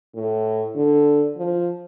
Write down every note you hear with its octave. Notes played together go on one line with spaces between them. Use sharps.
A2
D3
F3